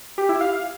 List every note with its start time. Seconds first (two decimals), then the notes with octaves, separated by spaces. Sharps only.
0.18 G4
0.29 E4
0.40 F5